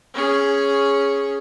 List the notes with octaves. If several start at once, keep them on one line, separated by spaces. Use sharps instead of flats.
C#4 G#4